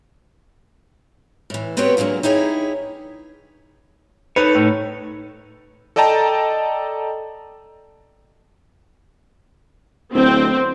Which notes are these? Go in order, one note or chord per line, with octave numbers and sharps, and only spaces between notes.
A2 E3
B3 C4 F#4 G4 B4 C#5
A#2 D3 F#3 G#3 A#3
D#4 E4 G4 G#4 C#5
D#4 A4 B4 C#5
A2
A4 D5 D#5 G5 A5 A#5
D1 C4